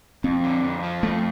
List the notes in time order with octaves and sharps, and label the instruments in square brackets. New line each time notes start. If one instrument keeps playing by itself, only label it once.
[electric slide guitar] F2 [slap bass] C4
[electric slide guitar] D3
F2
F3
[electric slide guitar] F2 [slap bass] A3